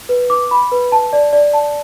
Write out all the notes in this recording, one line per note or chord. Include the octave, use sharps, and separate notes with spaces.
B4
D6
B5
B4
A5
D5
D5
A5